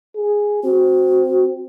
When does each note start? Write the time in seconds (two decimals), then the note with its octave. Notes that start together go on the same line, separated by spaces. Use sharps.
0.15 G#4
0.64 C4 F#4